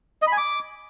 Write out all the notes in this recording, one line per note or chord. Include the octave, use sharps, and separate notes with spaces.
D#5
B5
G#5
D6